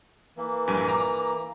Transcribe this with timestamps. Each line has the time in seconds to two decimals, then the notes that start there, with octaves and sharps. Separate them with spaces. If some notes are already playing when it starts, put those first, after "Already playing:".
0.37 E3 A#3
0.68 A#1 G2 G#5
0.88 A#5 D6